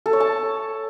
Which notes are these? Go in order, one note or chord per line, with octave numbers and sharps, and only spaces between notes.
A4
C#5
A5